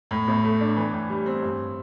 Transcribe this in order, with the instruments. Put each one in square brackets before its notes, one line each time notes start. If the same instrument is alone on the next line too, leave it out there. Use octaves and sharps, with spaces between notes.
[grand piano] A2
A1
A3
D4
E3
A2
G3
C4
G2